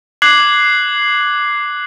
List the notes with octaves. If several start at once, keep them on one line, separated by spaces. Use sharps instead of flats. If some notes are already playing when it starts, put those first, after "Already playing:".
D6 F#6 G#6 C7 F#7